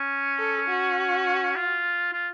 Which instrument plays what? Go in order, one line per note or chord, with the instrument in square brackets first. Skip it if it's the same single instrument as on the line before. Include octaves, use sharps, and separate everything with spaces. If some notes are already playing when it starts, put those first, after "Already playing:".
Already playing: [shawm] C#4
[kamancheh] A4
F#4
[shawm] F4
F4